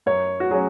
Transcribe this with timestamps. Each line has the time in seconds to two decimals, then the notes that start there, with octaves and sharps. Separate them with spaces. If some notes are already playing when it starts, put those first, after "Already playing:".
0.06 F#2 C#5
0.40 F#4
0.51 F#3 C#4 G#4